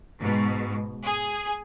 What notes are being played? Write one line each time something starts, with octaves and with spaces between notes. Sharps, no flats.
G#2 B2
G#4